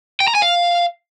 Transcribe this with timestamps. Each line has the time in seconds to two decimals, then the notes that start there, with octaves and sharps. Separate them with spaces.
0.20 G5
0.28 A#5
0.35 G#5
0.42 F5